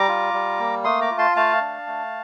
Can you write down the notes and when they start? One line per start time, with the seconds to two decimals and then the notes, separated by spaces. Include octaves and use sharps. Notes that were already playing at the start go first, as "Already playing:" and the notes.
Already playing: G3 A#5 D6
0.08 F4
0.34 G3
0.59 A#3
0.84 A3 C6 D#6
1.01 A#5 D6
1.11 F4
1.18 A5 C6
1.36 A3 F5 A5
1.61 D4
1.87 A3